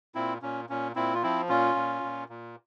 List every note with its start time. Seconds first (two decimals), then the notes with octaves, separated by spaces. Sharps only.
0.15 A#2 C4 E4
0.42 A#2 C#4
0.69 A#2 C#4
0.95 A#2 C4 E4
1.15 F4
1.23 F3 C4 E4
1.49 A#2 C#4 F4
1.75 A#2
2.03 A#2
2.29 A#2